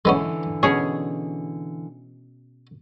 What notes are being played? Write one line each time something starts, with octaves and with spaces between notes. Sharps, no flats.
D3 E3 G#3 B3 C#4
B2 C#4 G#4 C#5